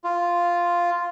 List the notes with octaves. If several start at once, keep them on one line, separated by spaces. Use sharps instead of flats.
F4